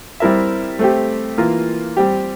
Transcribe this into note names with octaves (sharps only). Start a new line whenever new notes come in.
G3 C4 E4 A#4 E5
A3 C4 G4
E3 A#3 F4 A#4
G3 C4 G4